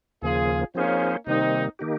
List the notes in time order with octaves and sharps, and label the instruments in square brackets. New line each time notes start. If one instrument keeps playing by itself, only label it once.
[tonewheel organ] D#2 C#3 F3 A#3 [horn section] F4 G#4
[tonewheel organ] F3 C4 D#4 G#4 C5 [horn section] A#3 C#4
[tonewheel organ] C3 D#3 G3 A#3 [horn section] C4 D#4
[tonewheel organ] D#3 A#3 D#4 G4